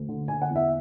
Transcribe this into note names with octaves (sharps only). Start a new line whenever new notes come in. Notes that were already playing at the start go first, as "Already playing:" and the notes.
Already playing: D2
D3
D3 G#5
F#5
E2
E5